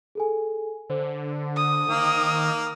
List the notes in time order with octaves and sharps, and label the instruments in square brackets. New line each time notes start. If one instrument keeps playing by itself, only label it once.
[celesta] G#4 A4 G#5
[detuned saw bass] D3 [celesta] C5
[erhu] D#6
[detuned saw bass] D#3 [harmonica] A#3